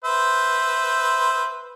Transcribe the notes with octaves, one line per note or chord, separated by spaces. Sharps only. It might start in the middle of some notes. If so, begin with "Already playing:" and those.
B4 C5 E5